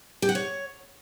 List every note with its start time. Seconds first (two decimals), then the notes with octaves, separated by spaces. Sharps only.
0.22 G4
0.29 F#5
0.35 C#5